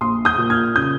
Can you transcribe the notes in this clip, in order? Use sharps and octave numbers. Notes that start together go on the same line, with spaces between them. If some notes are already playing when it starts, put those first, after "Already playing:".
A#1 C6 D#6
D#6 G6
A#2
F6 G#6
C#3 D#6 G6